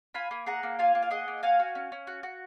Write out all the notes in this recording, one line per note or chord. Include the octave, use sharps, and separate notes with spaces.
F4 G#5 B5
A#3
G#4 F#5 A#5
A#3
F4 F5 G#5
A#3
F5
G#4 D#5 F#5
A#3
F#4 F5 G#5
F#4
C#4
C#4
F#4
F#4